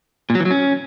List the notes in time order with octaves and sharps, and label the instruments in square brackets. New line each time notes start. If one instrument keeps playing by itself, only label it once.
[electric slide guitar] A#2
F#3
E3
F#3
C#4